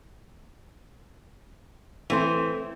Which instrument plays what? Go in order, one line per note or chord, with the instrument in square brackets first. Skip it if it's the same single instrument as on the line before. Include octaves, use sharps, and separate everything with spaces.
[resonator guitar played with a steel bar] E3 [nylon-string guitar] A3 C4 C5